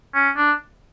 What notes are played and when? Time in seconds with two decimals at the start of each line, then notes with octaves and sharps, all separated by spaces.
0.14 C#4
0.36 D4